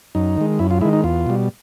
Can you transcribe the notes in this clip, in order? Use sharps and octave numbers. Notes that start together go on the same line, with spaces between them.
F#2 D#4
D#3 G#3
F#2 E4
F4
D#3 G#3 E4
D#4
E2 F4
B2 G3